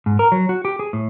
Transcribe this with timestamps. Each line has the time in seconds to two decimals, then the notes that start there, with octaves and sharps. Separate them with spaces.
0.06 G#2
0.19 A#4
0.32 F#3
0.49 F#4
0.65 G4
0.79 G#4
0.93 A2